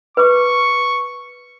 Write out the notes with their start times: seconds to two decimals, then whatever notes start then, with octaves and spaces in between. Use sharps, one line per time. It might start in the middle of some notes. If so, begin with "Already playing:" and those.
0.17 B4 C#6 D6